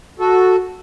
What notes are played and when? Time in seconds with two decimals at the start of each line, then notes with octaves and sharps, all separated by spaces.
0.19 F#4 A4